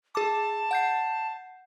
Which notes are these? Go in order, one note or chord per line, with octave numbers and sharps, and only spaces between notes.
G#4 A5 D6
F#5 G6 C7